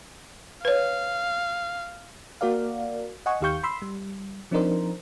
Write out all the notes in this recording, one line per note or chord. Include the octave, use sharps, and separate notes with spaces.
B4 C#5 F5
A#3 F#4 A#4 D5 F5
D#5 F#5 G#5 C#6
D#2 D#3 G4 F5 C#6 G6
B5 C6 E6
G3
F3 C4 D4 D#4 A#4 C5